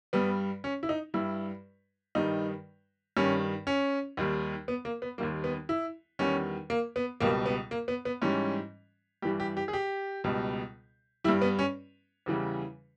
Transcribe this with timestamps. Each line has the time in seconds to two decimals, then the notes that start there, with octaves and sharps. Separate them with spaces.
0.13 G2 G3 B3
0.64 C#4
0.83 E4
0.89 D#4
1.14 G2 G3 E4
2.15 G2 D#3 G3 D#4
3.17 G2 D#3 G3 C#4
3.67 C#4
4.17 D#2 D#3 G3
4.68 B3
4.85 A#3
5.02 B3
5.18 D#2 D#3 G3 A#3
5.44 B3
5.69 E4
6.19 E2 D#3 G3 C#4
6.70 A#3
6.96 B3
7.20 C#2 B2 G3 A#3
7.46 B3
7.71 A#3
7.88 B3
8.05 B3
8.22 G#2 E3 G3 C#4
9.22 G2 E3 G3 G4
9.40 G4
9.57 G4
9.68 G#4
9.73 G4
10.24 C#2 B2 G3
11.24 G3 E4
11.28 G2
11.42 B3
11.59 C#4
12.26 E2 C#3 E3 G3